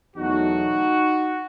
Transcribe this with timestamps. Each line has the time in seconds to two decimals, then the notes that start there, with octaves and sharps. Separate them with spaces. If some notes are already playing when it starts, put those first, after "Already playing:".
0.16 E2 B2 F#3 A3 D#4 F#4